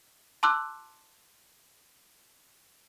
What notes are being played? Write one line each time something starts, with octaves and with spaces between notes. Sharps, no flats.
A5 C6 D6 E6 F#6